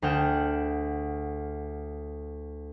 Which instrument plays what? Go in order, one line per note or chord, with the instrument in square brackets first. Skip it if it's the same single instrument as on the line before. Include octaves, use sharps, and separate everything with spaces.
[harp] D2 G#4 F#5 G5 F6 E7